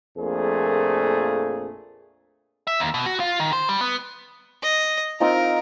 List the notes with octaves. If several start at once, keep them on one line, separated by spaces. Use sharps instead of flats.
A#1 F2 A#2 A3 G#4
E5
D#2
B2
F#4
F4
D#3
C5
G3
B3
D#5
C4 D#4 F4 A#4